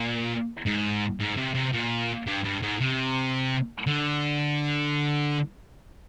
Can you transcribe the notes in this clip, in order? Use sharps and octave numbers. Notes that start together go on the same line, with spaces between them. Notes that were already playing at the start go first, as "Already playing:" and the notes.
Already playing: A#2
G#2
G#2
C3
C3
A#2
G2
G2
G#2
C3
D3